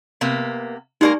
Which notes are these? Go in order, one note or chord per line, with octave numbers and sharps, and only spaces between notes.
C3 A#3 B3
G#3 A#3 D#4 G4 A#4 D5